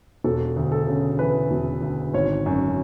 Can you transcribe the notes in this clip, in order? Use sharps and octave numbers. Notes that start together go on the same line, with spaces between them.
E1 A4
D2
A4
C#3
E3 B4
E1
D2
G#1 C#5
F#2